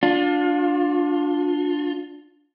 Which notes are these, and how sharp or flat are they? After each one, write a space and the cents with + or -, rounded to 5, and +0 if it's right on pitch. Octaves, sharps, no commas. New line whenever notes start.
D4 +0 F4 +30